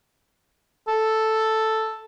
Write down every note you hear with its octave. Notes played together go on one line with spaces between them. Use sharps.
A4